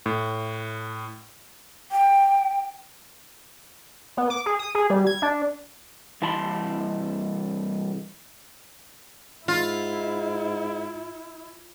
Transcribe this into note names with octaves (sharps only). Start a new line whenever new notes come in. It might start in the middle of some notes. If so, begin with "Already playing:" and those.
A2
G5
B3
D6
G#4
D#6
G#4
G3
G#6
D4
C2 E3 A5 B5 C6
G#2 E4 F4